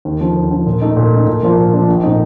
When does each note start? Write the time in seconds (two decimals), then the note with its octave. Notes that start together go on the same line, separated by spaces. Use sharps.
0.05 D#2
0.21 D3 F3
0.36 D#2
0.51 D3 F3
0.66 A#2
0.81 A3 D#4
0.97 A#2
1.12 A3 D#4
1.27 A#2
1.43 F3 A#3 D4 F4
1.58 A#2
1.73 F3 A#3 D4 F4
1.88 A#1
2.03 A#2 A3 C4 D#4